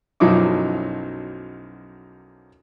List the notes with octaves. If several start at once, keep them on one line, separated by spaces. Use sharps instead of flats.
B1 F#2 F3 D#4 E4 D6